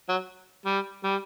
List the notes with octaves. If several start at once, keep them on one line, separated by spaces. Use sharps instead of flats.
F#3
G3
G3